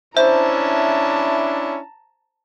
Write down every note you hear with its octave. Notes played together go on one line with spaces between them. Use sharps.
C#4 D4 E4 C5 E5 A5 A#5